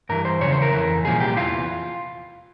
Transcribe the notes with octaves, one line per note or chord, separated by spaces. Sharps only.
G2 E3 A#4
C5
E2 C#3 F3 C#5
C5
A#4
F2 E3
C2 A#2 F3 G#4
G4
E2 E3 F4